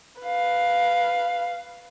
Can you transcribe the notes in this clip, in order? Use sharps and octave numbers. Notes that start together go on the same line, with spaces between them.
B4 F5